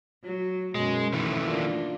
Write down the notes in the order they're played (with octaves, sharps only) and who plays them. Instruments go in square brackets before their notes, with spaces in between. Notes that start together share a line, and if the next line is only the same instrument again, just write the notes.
[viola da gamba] F#3
[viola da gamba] F#2 B2 [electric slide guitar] G#3
[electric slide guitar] D#3 E3 A3
[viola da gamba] A#3 D4 F4